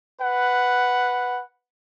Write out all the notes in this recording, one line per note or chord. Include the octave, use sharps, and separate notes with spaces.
B4 F#5